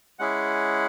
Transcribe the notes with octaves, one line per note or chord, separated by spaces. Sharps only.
G#3 C#4 E4 G#4 F#5